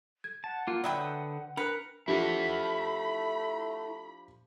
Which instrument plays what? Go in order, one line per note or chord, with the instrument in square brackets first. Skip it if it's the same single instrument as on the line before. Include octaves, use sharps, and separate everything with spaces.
[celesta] G#6
[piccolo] F#5 [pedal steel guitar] A5
[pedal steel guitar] A#3 F4 [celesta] D6
[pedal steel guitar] D3 B4 D#6 [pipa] F#3 E5 G5 [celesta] D5 B5
[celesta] D4 C#7 [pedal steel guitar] A#4 F#6 [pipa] B4
[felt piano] F3 D4 G4 [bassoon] A3 [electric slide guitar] E4 E5 F#5 [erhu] B5